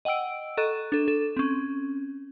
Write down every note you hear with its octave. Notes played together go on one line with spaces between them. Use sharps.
D#5 F#5 G5 E6 D7
A4 D#5 A#5 C#6 F#6
D4 A4
A4
C4 C#4